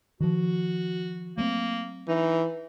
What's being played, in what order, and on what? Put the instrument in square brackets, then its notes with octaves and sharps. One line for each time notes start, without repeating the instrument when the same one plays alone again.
[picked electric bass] D#3 F3 [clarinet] F#4
[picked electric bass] F#3 A3 C4 [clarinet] A#3
[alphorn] E3 [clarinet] D#4